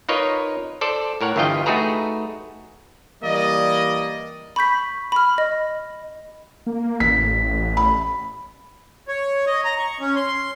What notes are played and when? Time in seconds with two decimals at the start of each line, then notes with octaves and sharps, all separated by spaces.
0.09 D#4 F4 A#4 B4 C#5 D#5
0.81 A4 C5 D5
1.21 A2 A#4 C#5 F#5
1.36 G1 G2 E3 F4 D#5 G5
1.66 A3 D#4 F#4 G#4 B4 A#5
3.23 E3 G3 A#3 D5 D#5
4.56 B5 C#6 G6 B6
5.12 B5 F6
5.38 D#5
6.67 A#3
7.00 A1 B6
7.77 B5
9.08 C#5
9.47 D#5
9.65 A#5
9.79 C#6
10.00 C#4
10.16 C6